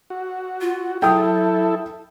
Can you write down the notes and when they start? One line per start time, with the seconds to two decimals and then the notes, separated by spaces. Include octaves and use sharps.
0.10 F#4
0.61 F4
1.02 F#3 E4 A4 G5 D#6